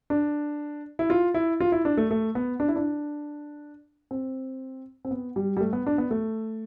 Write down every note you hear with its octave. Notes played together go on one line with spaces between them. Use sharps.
D4
E4
F4
E4
F4
E4
D4
A3
A3
B3
D4
E4
D4
C4
C4
B3
G3
G3
A3
B3
D4
B3
A3